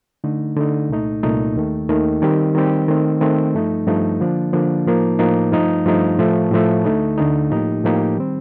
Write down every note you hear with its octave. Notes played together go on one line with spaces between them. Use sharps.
D3 A3 D#4
D3 A3 D#4
C2 A#2 A3 D#4
C2 A#2 A3 D#4
D#2 D#3 A3
D#2 D#3 A3
D#3 G3 C4 G4
D#3 G3 C4 G4
D#3 A3 C4
D#3 A3 C4
G2 F3 A3 D#4
G2 F3 A3 D#4
D3 F3 A#3 D4
D3 F3 A#3 D4
A2 F3 A#3 D#4
A2 F3 A#3 D#4
G2 F3 A3 D#4
G2 F3 A3 D#4
A2 F3 A3
A2 F3 A3
D2 D3 A3 D#4
D2 D3 A3 D#4
A2 F3 A#3 D#4 G4
A2 F3 A#3 D#4 G4
D#3 G3 C4